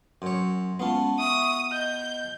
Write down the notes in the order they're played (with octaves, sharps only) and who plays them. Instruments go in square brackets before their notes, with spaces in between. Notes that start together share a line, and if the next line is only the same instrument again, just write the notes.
[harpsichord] F#2 C#5 [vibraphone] C6
[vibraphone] G#3 C#4 A5 [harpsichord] B3 F4
[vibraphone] E5 C#6 [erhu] D#6
[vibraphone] D#5 [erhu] G6